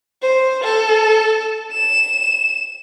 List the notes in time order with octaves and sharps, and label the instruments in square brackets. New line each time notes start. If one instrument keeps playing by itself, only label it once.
[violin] C5
A4
E7